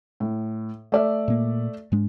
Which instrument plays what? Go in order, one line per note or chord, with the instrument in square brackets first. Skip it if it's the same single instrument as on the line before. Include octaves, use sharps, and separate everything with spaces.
[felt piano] A2
A3 D5 E5
[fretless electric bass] A#2 A#3
G#2 G#3 D4